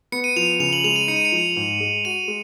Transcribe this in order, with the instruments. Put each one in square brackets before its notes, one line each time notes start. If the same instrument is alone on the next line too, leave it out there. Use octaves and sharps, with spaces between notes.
[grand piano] B3 [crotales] C#7
[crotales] D#7
[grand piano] F3 [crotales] F7
[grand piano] C#3 [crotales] F7
[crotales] F#7
[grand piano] G#3 [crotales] F7
[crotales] D#7
[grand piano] D#4 [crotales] C#7
[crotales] D#7
C#7
[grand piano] F3
G#2
G#3
[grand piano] F#4 [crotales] D#7
[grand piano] G#3